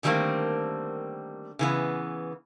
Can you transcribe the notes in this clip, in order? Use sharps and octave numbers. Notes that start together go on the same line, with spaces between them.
D3 D#3 G3 A3 A#3 C4
C#3 E3 B3